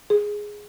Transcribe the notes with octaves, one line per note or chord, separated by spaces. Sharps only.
G#4